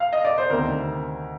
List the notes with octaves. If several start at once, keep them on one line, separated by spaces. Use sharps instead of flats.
F5
D#5
D5
C5
D2 C3 D#3 A#4